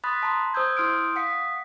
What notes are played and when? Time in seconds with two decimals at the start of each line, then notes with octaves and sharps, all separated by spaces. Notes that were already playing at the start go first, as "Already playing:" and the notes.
0.04 B5 C6 D#6 F#6 A6 B6
0.23 A5 A#5 C6
0.54 C5 D#6 E6 G6 G#6
0.77 E4 C6 D#6 F6 G6 D7
1.16 F5 F#5 D#6 B6 C#7